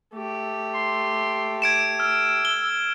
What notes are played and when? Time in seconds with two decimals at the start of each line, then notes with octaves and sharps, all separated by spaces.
0.15 A3 G4
0.74 C6
1.62 G#6 D7 E7
2.00 E6 F6
2.45 G7